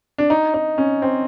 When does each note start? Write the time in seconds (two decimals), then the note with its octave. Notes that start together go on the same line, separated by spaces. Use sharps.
0.18 D4
0.30 D#4
0.54 D#4
0.78 C#4
1.02 C4